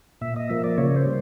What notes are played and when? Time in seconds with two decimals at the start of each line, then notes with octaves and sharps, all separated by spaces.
0.21 A#2 E5
0.36 D#5
0.50 F3 A#3 E5
0.64 D5
0.78 C#3 C#5
0.96 C5
1.06 G3